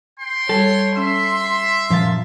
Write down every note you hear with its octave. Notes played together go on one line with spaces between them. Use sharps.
G5 C6
G3 A4 C#5
C#4 E5 C6
F#2 A#2 F3 F5 A6